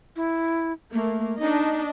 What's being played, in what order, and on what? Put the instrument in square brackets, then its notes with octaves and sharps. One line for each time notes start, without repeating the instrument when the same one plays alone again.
[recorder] E4
[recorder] A3 [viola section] A#3
[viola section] D4 D#5 [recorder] D#4